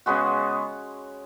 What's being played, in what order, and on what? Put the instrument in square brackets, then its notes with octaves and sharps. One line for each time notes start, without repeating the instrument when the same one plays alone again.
[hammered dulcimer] C#3 G#3 B3 F#4